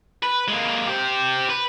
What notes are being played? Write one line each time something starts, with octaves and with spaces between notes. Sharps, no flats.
B4
G#3 A#3
G4 C5
B4